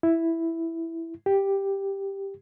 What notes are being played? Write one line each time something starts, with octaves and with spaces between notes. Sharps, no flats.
E4
G4